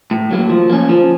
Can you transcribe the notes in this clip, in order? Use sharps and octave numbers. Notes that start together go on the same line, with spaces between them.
A2
F#3 A#3
F3
A#3 C#4
F3